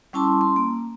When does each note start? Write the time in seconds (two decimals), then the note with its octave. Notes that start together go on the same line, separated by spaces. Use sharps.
0.13 G3 C#4 E4 A5 C6 D6
0.41 C6
0.56 A#3